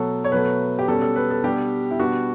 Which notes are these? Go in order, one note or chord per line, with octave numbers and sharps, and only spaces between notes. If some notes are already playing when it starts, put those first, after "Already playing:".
Already playing: B2 F#3 A3 A4
C#5
B2 F#3 A3 B4
G4
B2 G3 C#4 A4
A4
B4
A4
B2 G3 D4 G4
E4
B2 G3 B3 D4 F#4